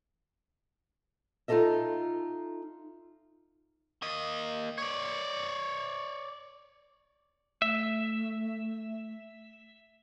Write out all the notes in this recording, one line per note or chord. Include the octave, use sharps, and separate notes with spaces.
D#4 F4 G#4 A4 D#5 E5
A#3 D#5
C#5 D5
A3 E5